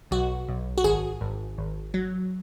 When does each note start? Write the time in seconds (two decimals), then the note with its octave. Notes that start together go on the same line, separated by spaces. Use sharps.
0.11 B1 F#4
0.48 B1
0.78 F#4
0.84 G#1 G#4
1.21 G#1
1.58 G#1
1.94 F#3